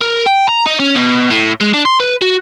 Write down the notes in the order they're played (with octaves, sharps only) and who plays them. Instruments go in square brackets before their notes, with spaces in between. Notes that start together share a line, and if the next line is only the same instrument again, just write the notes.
[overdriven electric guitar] A#4
G5
A#5
D#4
C#4
B2
A2
G#3
D4
C6
B4
F#4